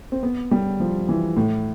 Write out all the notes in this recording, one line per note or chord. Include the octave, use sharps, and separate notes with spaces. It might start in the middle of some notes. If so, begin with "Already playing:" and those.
C4
B3
G3
F3
E3
A2